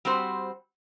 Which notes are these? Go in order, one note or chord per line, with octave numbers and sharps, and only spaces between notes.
G3 C4 F#4 C5